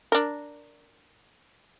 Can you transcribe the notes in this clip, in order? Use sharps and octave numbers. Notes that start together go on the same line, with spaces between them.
D4 A#4